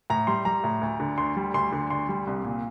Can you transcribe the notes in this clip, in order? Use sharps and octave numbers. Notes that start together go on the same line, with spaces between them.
A2 A#5
G3 C6
G3 A#5
A2
D2
D3
D2 C6
G3
D2 C6
D3
D2 C6
G3
C2
A#2